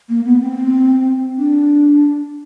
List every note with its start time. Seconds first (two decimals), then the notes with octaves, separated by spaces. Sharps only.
0.09 A#3
0.25 B3
0.41 C4
1.38 D4